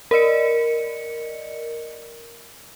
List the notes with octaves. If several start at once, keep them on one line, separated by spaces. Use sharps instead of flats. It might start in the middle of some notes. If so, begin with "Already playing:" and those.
A#4 D5 D#5 C#7